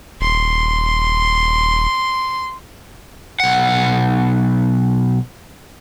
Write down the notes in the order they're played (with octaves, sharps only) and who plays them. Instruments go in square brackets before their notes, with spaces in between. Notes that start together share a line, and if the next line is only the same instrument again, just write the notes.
[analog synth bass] D#1 [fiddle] C6
[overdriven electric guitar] B1 F#5